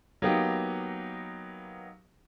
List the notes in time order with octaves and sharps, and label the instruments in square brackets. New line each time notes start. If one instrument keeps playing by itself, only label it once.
[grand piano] F#3 A#3 B3 D#4 G4